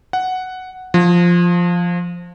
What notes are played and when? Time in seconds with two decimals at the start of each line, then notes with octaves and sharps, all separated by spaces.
0.13 F#5
0.94 F3